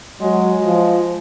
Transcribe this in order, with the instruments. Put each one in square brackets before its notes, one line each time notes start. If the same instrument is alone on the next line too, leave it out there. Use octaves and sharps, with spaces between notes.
[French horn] F#3 [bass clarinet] G#3
[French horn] F3